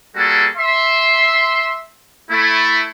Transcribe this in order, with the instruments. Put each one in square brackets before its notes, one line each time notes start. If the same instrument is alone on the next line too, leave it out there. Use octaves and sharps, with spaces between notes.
[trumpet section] G3 A3 A#3 F#4 G#4 A4
E5 C6
A3 E4